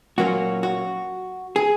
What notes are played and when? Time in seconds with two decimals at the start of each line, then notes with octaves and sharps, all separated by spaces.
0.18 A#2 F#3 A#3 C#4 F#4
0.63 F#4
1.56 G#4